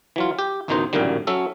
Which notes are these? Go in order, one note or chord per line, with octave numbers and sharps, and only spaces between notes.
E3 F#3 F4
G4
A1 D2 B2 D#3 D#4 C5
A1 F#2 A#2 D3 D#3 G3
F#3 C#4 A4 E5